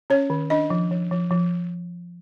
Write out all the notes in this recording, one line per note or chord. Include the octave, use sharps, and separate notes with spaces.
C#4 C#5
D#3
D4 D#5
F3
F3
F3
F3